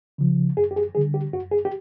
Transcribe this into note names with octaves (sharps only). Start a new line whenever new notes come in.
C#3 F3
F#2 G#4
G4
G#4
D3 G3 G#4
G4
F#2 F#4
G#4
G4